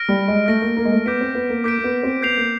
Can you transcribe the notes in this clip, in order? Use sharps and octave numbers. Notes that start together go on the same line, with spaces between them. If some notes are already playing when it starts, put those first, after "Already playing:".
Already playing: F6 A#6 D7
G3
G#3
A3 F6 A#6 D7
A#3
A#3
G#3
A3
B3 D6 G6 B6 D7
C4
B3
A#3
A#3 D6 G6 B6 D7
A#3
B3
C4
B3 G6 C7 F7
A#3